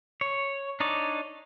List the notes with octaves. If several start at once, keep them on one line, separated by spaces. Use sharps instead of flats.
C#5
D4 D#4 C#5 D5